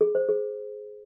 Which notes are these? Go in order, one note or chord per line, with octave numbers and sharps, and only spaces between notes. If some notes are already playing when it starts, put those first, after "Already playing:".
G#4
C5
G#4